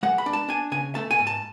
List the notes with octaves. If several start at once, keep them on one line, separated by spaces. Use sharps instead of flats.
G#3 F#5
B5
D4
A5
D4 G#5
C#3 G#5
A3 A5
G#5
G#2
A5